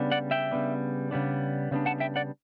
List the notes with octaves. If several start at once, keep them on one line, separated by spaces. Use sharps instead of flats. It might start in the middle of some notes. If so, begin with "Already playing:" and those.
Already playing: C#3 G3 B3 D4
D5 F#5
E5 G5
C#3 G3 B3 D4
C#3 G3 B3 D4
C#3 G3 B3 D4
F#5 A5
E5 G5
D5 F#5